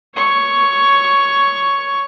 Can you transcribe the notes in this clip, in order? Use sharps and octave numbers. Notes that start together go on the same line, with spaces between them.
C#5 C#6